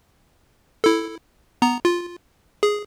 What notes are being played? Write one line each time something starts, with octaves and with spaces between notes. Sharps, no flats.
E4 A4
B3 A#5
F4
G#4